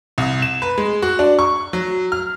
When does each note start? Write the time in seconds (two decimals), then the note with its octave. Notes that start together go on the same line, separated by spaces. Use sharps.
0.18 C2
0.42 E7
0.62 B4
0.78 G#3
1.02 F#4
1.19 D4
1.39 C#6
1.73 F#3
2.12 F6